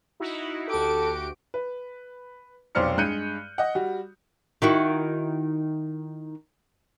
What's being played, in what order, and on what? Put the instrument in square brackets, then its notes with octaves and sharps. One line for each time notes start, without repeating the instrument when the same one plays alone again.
[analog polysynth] D#4 E4 F#4
[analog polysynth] D2 F#4 D7 [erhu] G4 [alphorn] A4
[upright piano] B4
F1 B1 C5 D5 F6 C#7
G2 G#3 F#6 G6 C#7 D#7
D#5 F#5
G3 F#4
[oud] D#3 E4 F#4